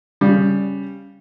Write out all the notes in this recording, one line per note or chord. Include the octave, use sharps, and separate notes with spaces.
C#3 G3